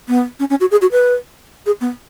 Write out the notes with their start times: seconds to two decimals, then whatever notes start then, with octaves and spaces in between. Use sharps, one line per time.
0.08 B3
0.40 C#4
0.50 C#4
0.61 F#4
0.71 G#4
0.82 F#4
0.92 B4
1.66 G#4
1.81 B3